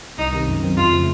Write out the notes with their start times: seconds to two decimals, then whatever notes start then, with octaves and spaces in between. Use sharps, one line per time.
0.18 C2 D#4
0.33 C3 D#3
0.48 F#2
0.63 D#3 F#3 C4 D#4
0.77 F2 F4
0.92 C#3 F3 A3